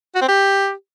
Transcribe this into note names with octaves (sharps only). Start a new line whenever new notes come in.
F#4
C4
G4